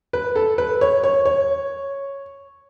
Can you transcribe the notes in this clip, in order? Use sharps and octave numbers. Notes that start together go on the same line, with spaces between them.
B4
A4
B4
C#5
C#5
C#5